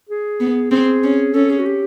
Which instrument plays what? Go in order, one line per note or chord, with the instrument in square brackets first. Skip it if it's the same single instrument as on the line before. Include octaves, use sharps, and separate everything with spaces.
[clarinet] G#4
[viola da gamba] B3
[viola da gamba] C4 [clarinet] G#4
[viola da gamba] C#4
[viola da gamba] C#4 [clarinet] A4
[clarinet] G#4
F#4
G4